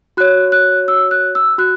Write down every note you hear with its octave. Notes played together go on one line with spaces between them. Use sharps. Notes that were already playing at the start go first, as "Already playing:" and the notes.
F#4 C#5 F#6
F#6
E6
F#6
E6
F#4 F#6